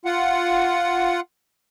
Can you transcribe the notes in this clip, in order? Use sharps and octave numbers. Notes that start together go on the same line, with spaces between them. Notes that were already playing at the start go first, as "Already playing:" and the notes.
F4 F#5